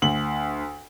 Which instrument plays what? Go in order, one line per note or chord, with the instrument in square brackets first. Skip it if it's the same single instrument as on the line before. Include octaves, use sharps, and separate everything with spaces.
[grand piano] D2 F#7